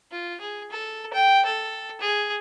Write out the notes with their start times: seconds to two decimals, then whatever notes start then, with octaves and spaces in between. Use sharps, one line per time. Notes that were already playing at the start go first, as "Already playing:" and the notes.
0.11 F4
0.41 G#4
0.71 A4
1.13 G5
1.46 A4
2.00 G#4